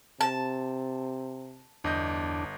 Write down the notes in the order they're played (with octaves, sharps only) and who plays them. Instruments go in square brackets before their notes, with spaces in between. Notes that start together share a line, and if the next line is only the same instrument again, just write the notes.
[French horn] C3 [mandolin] A5
[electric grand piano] G1 D#5 G6 [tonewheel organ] E2 D4